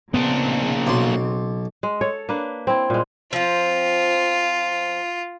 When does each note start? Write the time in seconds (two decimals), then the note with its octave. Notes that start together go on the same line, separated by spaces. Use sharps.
0.14 A#2 C#3 B3 C4 D4 D#4
0.87 B1 C6
1.83 G#3
2.01 A4 C#5
2.29 A#3 D4 B4
2.67 C4 E4
2.90 A#2 G#3
3.33 F3 C4 F4